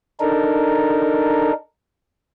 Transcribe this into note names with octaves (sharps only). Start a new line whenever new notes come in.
D4 D#4 A4 A#4